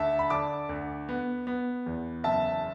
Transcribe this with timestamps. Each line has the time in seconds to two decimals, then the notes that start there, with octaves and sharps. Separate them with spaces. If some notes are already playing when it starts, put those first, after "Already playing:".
Already playing: D2 E5 A5
0.19 B5
0.30 D3 A5 D6
0.69 D2
1.09 B3
1.47 B3
1.86 E2
2.24 F#1 E5 A5